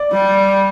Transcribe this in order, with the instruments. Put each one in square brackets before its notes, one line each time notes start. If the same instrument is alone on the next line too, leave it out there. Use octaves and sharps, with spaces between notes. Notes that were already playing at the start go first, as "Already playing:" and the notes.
Already playing: [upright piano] D5
[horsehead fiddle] G3